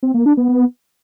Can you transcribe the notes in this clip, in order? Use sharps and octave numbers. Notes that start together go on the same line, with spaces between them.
C4
A#3
D4
B3
B3